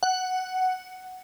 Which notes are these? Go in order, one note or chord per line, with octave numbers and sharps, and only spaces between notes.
F#5